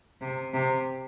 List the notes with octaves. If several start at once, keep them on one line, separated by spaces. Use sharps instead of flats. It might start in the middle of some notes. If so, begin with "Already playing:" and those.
C3
C3